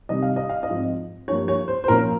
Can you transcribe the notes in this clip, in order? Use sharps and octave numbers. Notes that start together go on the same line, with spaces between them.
C3 D#3 G3 D#5
F5
D#5
F5
D#5
G#2 F3 C4
G2 F3 A#3 C#5
C#5
C5
C5
A#2 F3 A#3 C#4 A#4